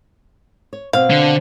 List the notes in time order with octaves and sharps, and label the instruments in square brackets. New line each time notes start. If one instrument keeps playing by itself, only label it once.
[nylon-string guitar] C#5
[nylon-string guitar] B2 C4 [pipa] F5
[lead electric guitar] D3